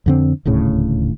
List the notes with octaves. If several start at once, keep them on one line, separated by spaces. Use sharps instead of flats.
F2 D3 C4
D#1 D2 A2 C#3